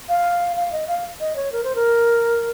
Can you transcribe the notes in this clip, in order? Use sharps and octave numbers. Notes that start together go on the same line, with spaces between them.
F5
F5
D#5
F5
D#5
C#5
A#4
C5
A#4